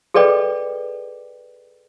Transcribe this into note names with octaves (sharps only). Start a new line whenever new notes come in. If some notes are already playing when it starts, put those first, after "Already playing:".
G#4 A4 B4 D5 D#5 G5